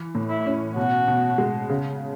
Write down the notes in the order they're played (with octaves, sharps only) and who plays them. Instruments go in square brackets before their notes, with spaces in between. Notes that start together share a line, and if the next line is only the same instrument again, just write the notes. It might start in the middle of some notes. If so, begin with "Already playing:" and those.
Already playing: [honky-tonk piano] E3
A2
[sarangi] E4
[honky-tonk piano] C#4
[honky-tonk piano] B2 [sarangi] F#4
[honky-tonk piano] B2
G#3
C#3